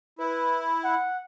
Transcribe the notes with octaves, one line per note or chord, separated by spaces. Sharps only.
E4 B4
F#5